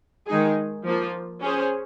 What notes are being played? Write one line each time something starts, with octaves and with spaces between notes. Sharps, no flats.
D#3 G#3 D#4 G#4
F3 A#3 F4
C#4 G#4 C5